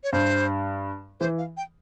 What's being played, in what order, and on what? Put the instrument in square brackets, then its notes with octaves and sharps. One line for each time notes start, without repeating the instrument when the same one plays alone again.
[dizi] C#5
[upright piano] G2 [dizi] C5
[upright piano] E3 [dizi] C5
[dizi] F5
G5